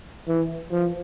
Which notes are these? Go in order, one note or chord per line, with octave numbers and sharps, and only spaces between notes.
E3
F3